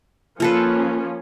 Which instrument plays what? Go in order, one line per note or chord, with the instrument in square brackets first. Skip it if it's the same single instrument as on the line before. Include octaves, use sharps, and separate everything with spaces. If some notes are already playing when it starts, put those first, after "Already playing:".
[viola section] F3 A#3 C#4 [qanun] F4 A4 B4